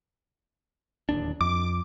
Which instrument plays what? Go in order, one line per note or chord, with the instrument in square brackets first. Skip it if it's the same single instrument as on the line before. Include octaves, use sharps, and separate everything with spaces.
[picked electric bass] D1 D#2 D4
[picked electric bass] F2 [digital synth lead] D6